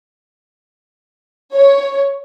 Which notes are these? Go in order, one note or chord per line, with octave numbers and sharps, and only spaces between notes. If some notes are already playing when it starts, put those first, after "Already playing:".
C#5